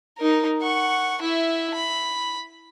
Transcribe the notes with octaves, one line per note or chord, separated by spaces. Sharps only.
D#4 A#4
F#5 C#6
E4 E5
B5